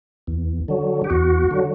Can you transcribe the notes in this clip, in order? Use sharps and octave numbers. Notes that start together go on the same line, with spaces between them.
E2
D3 F#3
G4
E2 F#4
D3 F#3